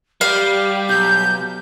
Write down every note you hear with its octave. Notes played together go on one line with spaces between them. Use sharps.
G3 G4 F5
B1 G6